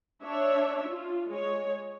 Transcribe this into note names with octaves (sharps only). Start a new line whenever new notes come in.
D4 C#5 E5
F4
G#3 C#5